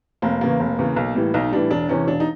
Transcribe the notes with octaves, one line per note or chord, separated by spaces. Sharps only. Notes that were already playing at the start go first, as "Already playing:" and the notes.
F1 A#3
E2 C#3 E3 A#3
F1
E2 C#3 E3
B1
A2 E3 G3
B1 D#4
A2 E3 G3 D4
E1 D4
E2 C3 E3 C#4
E1 D4
D#4